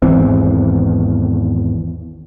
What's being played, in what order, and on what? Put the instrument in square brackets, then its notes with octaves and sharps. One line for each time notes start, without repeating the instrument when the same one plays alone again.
[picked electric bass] G#1 E2 E3 C4